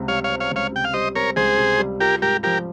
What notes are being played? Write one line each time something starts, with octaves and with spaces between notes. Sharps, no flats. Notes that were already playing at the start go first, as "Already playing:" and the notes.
Already playing: C#2 C3 C4
G3 C#5 F5
C#5 F5
C4
C#5 F5
C#2 C#5 F5
C3 G5
F5
G3 C5 D#5
C4 A#4 C#5
C#2 G#4 C5
C3
G3
F4 G4 A#4
G#2 G4 A#4
F3 G4 A#4